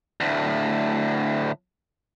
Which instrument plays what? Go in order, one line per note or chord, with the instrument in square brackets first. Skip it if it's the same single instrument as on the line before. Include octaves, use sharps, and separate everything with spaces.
[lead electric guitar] D2 A2